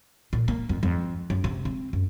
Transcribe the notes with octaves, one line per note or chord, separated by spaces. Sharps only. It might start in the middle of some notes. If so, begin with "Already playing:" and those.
A#2
A#3
F2
F2
F#2
C3
C4
F#2